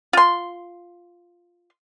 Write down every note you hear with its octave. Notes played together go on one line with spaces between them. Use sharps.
F4 C6